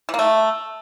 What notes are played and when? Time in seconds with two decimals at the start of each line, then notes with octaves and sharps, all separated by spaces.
0.09 E3
0.14 A#3
0.19 A3